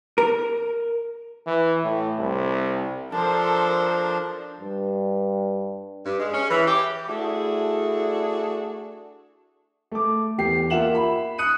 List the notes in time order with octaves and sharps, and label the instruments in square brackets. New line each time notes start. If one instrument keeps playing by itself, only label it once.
[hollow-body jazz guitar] A#4
[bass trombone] E3
A2
C2
[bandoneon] F3 D4 [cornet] A4 [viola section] A#4 C5 [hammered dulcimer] A5
[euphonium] G2
[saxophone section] G2
G#3
C#4
E3
G4
A3 D4 E4 F#4 G#4
[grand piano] A3 D6
E2 G4 C7
A#3 F4 E5 F#5 E7 F#7
B5
D#6 F#6 C#7 D#7